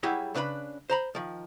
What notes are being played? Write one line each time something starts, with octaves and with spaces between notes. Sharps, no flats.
F#3 G3 E4 G4 G#4
C#3 D4 B4 F5 B5
C5 A#5 B5
D#3 F3